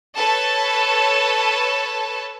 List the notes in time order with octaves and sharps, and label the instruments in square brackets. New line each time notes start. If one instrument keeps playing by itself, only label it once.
[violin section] A4 B4 C#5 A5